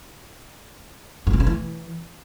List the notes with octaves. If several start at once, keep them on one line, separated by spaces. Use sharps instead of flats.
G2
B2
C#3
E3